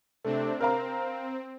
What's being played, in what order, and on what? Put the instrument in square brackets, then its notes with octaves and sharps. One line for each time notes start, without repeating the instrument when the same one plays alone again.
[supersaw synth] C3 C4 D4 [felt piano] A3
[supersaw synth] C4 [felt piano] A#4 F5 A#5